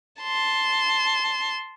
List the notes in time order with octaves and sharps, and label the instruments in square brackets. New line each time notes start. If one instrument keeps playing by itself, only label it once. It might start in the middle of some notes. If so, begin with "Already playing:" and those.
[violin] A5 C6